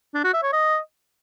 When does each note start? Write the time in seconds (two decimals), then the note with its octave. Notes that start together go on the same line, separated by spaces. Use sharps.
0.14 D4
0.24 F#4
0.34 E5
0.43 C#5
0.53 D#5